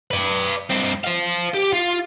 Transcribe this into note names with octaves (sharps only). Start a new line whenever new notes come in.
B4 D5
G2 C4
C5 F5
G4
F4